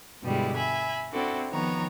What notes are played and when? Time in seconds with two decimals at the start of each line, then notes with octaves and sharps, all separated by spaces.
0.23 G2 B2 D3 G3 G#3 E4
0.55 E5 G#5 B5
1.12 C4 D4 E4 F#4 A4
1.50 D#3 F3 B3 C#5 A#5